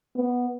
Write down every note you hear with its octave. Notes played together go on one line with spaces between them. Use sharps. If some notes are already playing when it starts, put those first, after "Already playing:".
B3